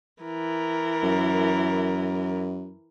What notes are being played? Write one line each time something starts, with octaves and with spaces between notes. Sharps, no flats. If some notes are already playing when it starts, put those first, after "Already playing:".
E3 A#4
F#2